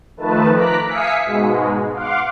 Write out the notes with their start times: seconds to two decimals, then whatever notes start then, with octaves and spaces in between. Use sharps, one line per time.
0.17 D#3 F3 A3 B4 A5
0.53 A#5 D6 F#6 B6
0.86 E5 F5 G#5 D#6 B6 C#7
1.24 G#2 B2 G#3
1.92 F5 F#5 C6 D6